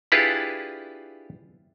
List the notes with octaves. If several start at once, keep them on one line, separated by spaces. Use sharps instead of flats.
D4 E4 F4 G4 G#4 B4